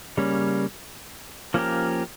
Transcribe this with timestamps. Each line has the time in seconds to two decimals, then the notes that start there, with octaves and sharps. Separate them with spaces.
0.17 C#3 G3 A#3 C#4
1.54 F3 A#3 C#4 G4 A#4